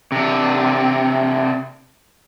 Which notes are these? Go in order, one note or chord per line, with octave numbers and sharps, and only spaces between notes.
C3 D4